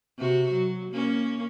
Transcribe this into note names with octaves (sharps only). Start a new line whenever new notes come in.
C3 F#4
F#3
A#3 C#4